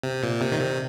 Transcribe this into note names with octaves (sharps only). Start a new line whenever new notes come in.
C3
A#2
C3
D#3
C3